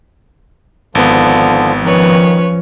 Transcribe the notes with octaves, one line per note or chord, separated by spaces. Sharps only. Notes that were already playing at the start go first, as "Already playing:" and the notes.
G#1 D3 F3 B3
D#3 F3 C#4 B4 C#5